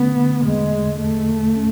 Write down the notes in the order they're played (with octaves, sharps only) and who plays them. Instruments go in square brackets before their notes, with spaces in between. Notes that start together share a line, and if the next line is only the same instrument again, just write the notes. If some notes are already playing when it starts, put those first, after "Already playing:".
Already playing: [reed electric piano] D3 A3 C#4 [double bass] B3
[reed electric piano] D3
[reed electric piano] E2 [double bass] G#3
[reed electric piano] E2
[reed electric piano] E2 [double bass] A3
[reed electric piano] E2
C#4